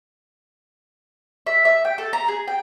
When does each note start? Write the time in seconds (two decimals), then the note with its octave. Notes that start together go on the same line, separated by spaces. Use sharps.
1.47 E5
1.65 E5
1.85 G5
1.98 A4
2.13 A#5
2.28 G#4
2.48 G5